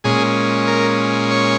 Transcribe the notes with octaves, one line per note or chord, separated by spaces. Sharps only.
A#2 G#3 C#4 G#4
A#4
C#5